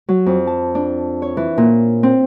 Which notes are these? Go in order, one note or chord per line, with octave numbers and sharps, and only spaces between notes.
F#3
F2
A5
D4
C#5
E3
A#2
C4